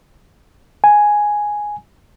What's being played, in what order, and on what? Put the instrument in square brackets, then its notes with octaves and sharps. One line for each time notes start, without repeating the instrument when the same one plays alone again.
[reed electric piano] G#5